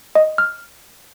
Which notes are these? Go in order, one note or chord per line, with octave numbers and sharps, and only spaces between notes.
D#5
F6